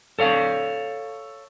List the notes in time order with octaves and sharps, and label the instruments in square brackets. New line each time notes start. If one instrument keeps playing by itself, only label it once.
[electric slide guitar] A4 C#5 F5